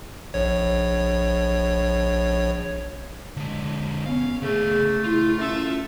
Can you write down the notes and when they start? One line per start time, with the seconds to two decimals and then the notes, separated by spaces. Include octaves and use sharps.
0.34 A#1 C#5
3.37 D3 G#3
4.06 B3 C#4 F5
4.42 C#3 A3 G#4 A4
5.04 E4 F4
5.39 C#4 A4 E5